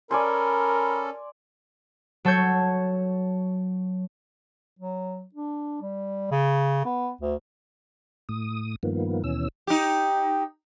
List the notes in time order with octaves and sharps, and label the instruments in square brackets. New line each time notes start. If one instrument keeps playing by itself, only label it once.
[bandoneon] C#4 A4 [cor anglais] A#4 [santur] D5 G#5 C6 [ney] B5
[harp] F#3 A4 C#5 G6 G#6
[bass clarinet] F#3
D4
G3
C#3
B3
D2
[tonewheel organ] A2 D#6
G2 D#3 F3 A#3 B3
D#2 B2 E3 C#4 E6
[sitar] D#4 G4